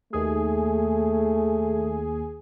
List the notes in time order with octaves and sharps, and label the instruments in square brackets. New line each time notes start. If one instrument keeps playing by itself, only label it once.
[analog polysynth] D#2 G#4 [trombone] A3